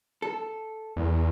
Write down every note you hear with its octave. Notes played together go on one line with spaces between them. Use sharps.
A4
E2